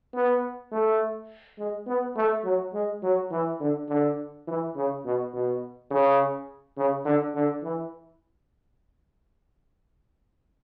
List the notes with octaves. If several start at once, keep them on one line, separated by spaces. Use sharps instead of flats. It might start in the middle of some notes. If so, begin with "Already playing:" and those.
B3
A3
G#3
B3
A3
F#3
G#3
F#3
E3
D3
D3
E3
C#3
B2
B2
C#3
C#3
D3
D3
E3